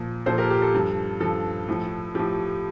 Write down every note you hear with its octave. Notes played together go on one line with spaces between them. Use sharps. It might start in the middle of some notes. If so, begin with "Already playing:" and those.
Already playing: A#2 F3
A#2 F3 A4 C5
G4 A#4
G4
A4
G2 F3
G2 F3 A4
A2 F3
A2 F3 G4